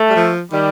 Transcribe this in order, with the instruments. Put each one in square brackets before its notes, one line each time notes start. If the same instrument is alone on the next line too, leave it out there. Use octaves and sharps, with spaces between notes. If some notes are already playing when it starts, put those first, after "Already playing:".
Already playing: [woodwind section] A3
[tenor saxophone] G3
F3
[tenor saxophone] D#3 [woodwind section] G3